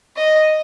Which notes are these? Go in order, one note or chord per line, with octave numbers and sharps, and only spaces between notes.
D#5